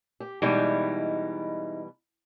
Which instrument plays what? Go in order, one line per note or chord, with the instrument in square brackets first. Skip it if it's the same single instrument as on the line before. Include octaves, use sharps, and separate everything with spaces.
[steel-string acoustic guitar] G4
[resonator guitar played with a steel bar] B2 E3 G3 [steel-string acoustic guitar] G#3 D#4 E4